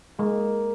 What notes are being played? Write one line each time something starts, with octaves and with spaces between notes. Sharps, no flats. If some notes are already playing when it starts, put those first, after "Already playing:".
G#3 A#3